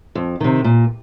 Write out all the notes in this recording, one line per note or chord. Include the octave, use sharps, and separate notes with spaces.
F2
C3 D#3
A#2